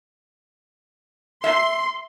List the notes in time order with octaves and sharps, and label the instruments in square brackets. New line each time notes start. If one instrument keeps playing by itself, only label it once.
[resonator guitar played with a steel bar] E5 [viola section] C6